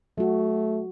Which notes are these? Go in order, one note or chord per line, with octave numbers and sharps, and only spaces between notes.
F#3 A3 F#4